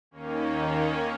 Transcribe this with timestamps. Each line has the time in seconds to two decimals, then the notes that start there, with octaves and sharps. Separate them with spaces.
0.11 D#2 D#3 A#3 C#4
0.55 A#3 C#4